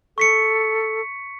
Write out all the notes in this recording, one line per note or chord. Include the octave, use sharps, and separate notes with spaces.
A4 C#6 B6 C#7